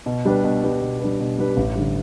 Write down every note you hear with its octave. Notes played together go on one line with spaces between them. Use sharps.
B2
G3 D4 G4 B4
B2
G3 D4 G4 B4
B2
G3 D4 G4 B4
B2
G3 D4 G4 B4
A1
D3 G3